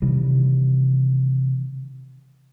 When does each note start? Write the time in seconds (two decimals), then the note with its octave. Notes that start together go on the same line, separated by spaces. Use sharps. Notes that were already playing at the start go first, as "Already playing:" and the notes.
0.02 C3 D#3 E3 G3